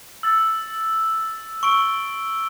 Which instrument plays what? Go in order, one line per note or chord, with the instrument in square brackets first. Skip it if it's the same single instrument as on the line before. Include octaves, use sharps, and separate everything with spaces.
[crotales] E6 A6
[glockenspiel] C#6 [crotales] E6 D7 G7